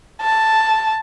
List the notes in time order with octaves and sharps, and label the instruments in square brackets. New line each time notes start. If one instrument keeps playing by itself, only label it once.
[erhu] A5